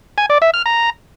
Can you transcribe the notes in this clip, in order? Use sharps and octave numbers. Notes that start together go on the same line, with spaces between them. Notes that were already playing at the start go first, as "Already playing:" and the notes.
G#5
D5
E5
F6
A#5